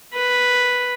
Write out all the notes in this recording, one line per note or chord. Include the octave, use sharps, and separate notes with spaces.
B4